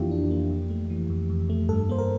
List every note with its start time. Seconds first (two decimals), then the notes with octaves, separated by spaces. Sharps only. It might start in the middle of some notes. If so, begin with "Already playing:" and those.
Already playing: F2 E3 A#3 D4 E4 F4 G4
0.11 D4
0.31 A#3
0.51 F2
0.70 A3
0.90 E3
1.10 F2
1.30 F2
1.50 A3
1.69 G2 A4
1.89 A#3 C5
1.98 A#4